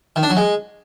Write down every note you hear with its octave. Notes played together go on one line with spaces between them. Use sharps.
D#3
D4
F#3
G#3